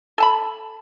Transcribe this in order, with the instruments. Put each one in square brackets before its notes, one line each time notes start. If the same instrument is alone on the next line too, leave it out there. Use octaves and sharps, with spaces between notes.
[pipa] A4 A5 B5